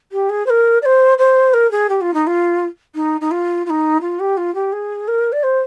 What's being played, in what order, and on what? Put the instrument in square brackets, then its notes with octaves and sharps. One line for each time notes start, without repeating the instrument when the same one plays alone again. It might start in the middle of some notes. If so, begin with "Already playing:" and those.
[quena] G4
G#4
C5
A#4
D5
C5
C5
A#4
G#4
G4
F4
D#4
F4
D#4
D#4
F4
F4
D#4
F4
G4
F4
G4
G#4
A#4
D5
C5